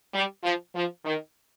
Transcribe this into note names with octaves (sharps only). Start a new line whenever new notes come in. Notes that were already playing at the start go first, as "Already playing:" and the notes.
G3
F3
F3
D#3